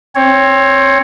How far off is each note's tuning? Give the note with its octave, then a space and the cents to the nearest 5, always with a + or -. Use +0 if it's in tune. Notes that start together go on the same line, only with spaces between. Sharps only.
C4 +20 C#5 +0